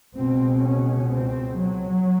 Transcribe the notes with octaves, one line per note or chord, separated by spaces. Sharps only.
C#2 B2 C4
C#4
C4
F#3